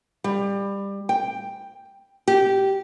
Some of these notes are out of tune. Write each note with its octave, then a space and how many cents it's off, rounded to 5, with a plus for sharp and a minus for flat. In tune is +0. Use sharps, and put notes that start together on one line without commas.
G3 +20
G5 +5
G4 -15